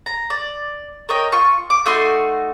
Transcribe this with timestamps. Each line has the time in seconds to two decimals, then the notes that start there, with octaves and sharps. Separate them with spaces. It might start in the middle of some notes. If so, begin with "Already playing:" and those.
0.06 A#5
0.30 D5
1.09 A#4 C#5 D#5 G5
1.32 F4 C#6
1.70 D6
1.86 A3 D#4 F#4 C6